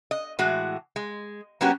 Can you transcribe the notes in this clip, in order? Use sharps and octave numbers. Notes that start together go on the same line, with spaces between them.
D#5
A2 E3 G#3 F#4
G#3
F#3 A#3 B3 C#4 F#4 G4